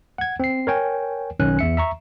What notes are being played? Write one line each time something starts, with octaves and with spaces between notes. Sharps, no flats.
F#5 G#6
C4 C7
A#4 C#5 G5 G#5
B1 D#3 C#4 G#5 F#6
E2 E5 C#7
E5 A#5 C#6